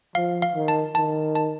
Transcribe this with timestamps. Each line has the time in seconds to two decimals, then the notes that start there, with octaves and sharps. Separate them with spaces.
0.15 F3 F5
0.42 F5
0.55 D#3
0.68 A5
0.95 D#3 A5
1.35 A5